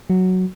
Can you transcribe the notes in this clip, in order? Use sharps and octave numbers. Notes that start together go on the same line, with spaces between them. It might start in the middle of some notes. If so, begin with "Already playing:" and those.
F#3